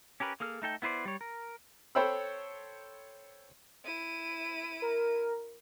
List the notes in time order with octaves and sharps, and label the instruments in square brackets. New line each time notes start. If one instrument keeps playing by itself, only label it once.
[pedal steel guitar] C#4 G4 A#4 B4
A#3 G#4 A4 F6
A3 D#4 A4 G5
B3 E4 B4 C5 D5
G3 C#5
A#4
[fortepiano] A4 C5 C#5 G5 B5 E6
[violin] E4 D#7
[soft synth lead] A#4